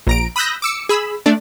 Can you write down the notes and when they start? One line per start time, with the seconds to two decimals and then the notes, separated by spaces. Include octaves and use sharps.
0.07 A#1 A#5 D7
0.36 B5 D#6 E6 F#6 G6 A#6
0.62 D6 E6 C#7
0.89 G#4 B5 E6
1.26 A3 D4 D5